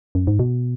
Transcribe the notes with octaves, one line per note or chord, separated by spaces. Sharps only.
F#2
G#2
B2